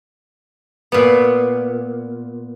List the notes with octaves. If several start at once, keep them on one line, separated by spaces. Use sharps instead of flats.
A#2 B3